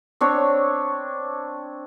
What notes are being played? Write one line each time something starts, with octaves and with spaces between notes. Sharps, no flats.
C4 D4 C#5